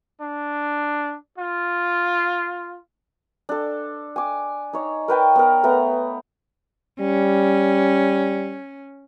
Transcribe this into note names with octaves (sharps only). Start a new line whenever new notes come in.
D4
F4
D4 A4
G#5 D6
D#4 C#5
A#4 B4 G5 A5
B3 A#4
A3 B3 A#5
G3 C#4